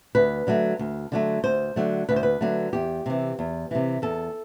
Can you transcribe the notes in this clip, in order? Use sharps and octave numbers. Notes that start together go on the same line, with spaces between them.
D2 B4
D3 F#3 A3
D2
D3 F#3 A3
D2 C5
D3 F#3 A3
D2 B4
C5
B4
D3 F#3 A3
E2 G4
C3 E3
E2
C3 E3
E2 A4